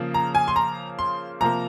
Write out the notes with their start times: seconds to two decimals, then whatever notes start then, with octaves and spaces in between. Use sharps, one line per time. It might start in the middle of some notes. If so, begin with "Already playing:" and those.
Already playing: C#3 F3 A#3
0.14 A#5
0.35 G#5
0.48 C6
0.56 A#5
0.99 C6
1.40 C3 F3 A#3 A#5